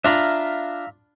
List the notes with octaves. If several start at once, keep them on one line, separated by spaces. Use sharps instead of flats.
D4 F4 E5 F5 A#5 B5